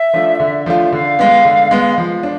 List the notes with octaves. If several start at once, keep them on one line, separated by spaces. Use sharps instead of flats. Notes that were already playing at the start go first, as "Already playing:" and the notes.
Already playing: E5
F3 A3 D4 F4
D3
F3 A3 D4 F4
D3 F5
G#3 B3
D3
G#3 B3
F3
D4